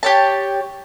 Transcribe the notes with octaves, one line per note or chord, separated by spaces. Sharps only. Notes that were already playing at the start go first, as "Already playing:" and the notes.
G4 C#5 A5